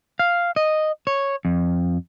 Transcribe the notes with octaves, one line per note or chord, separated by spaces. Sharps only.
F5
D#5
C#5
F2